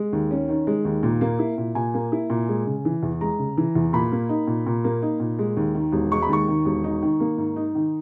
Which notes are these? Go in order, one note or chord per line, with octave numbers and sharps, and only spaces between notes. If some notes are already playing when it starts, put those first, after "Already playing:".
Already playing: G#3
D#2
C#4
D#3
G#3
D#2
A#2
A#3
E4
A#2
A#2 G#5
A#3
E4
A#2
G#3
C#3
E3
E2
G#3 A#5
C#3
E3
E2
A#2 B5
A#3
D#4
A#2
A#2
A#3
D#4
A#2
G#3
D#2
D#3
E1
G#3 C#6
B5
D#2 C#6
D#3
E1
D#4
D#3
A#3
G#2
D#4
D#3